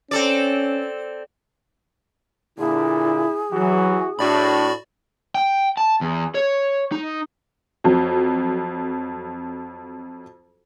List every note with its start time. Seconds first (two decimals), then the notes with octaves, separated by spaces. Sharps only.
0.11 C4 C#4 A4 D5
2.58 A#2 D3 E4 G#4
3.52 E3 F#3 F#4
4.19 A2 D4 F#4 D5 B5
5.35 G5
5.77 A5
6.01 E2
6.35 C#5
6.92 D#4
7.84 F2 F#3